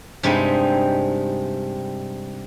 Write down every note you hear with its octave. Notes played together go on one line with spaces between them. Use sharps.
G2 C3 G3 G#3 C4 D#4